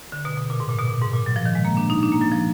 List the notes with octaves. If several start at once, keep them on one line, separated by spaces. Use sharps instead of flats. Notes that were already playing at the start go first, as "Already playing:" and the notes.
D3
B2
B2
A#2
G#2
A#2
B2
A#2
G#2
A#2
F#3
F3
D#3
G#3
A#3
D4
D#4
D4
A#3
F#3
F3